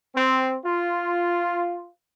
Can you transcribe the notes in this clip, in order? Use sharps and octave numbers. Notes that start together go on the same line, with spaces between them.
C4
F4